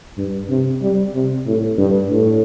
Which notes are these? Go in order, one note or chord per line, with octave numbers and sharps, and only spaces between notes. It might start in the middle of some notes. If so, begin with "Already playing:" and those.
G2
C3
G3
C3
A2
G2
A2